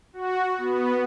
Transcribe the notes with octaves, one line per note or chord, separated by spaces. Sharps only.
F#4
B3